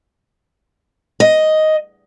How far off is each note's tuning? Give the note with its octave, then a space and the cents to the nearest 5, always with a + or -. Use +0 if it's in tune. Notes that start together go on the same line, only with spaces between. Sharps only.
D#5 +5